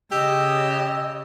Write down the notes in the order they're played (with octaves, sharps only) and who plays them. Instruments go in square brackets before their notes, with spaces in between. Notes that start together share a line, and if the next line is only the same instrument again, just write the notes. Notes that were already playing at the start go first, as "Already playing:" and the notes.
[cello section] C#3 [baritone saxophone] G4 [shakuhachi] D#5 [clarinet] E6